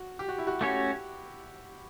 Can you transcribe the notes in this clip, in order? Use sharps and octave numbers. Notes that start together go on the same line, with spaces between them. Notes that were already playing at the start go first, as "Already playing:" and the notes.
Already playing: F#4
G4
F#4
E4
F#4
A3 C#4 F#4 G4 C#5